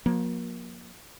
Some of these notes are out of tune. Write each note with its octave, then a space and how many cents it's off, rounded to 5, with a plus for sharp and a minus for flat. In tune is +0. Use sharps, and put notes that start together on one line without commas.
F3 +45 A#3 +25